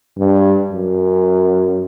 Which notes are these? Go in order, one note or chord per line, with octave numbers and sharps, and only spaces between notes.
G2
F#2